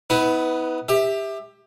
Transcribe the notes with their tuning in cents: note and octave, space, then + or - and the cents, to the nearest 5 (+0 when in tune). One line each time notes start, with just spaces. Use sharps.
B3 +15 E4 -45 B4 +0
G4 +20 E5 -10